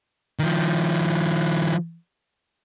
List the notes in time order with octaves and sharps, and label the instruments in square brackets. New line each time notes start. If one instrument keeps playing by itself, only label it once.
[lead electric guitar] D#3 F3